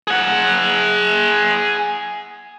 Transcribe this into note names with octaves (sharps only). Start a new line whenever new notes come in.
G#4 F#5